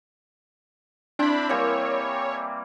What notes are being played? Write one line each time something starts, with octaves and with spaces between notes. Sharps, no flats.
C4 D4 E4 B5
E3 G3 A#3 C#5